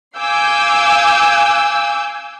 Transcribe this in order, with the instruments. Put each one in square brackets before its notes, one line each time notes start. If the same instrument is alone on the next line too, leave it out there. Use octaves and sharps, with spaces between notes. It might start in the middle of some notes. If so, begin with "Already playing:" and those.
[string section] F5 G#5 D6 E6 G6